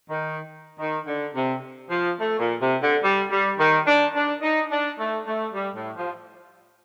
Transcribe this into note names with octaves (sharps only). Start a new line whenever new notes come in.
D#3
D#3
D3
C3
F3
A3
A#2
C3
D3
G3
G3
D#3
D4
D4
D#4
D4
A3
A3
G3
A2
F3